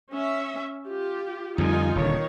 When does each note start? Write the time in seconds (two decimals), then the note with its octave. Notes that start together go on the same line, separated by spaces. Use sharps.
0.12 C#4 E5
0.88 F4 G4
1.58 F2 D3 G3 D#4 F4 G#5
1.96 D#1 D3 D#3 C#5